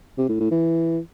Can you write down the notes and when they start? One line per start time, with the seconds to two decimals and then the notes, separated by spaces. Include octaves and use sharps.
0.18 C3
0.29 A2
0.40 A2
0.51 E3